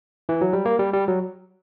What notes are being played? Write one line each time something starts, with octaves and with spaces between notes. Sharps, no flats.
E3
F#3
G3
A#3
G3
G3
F#3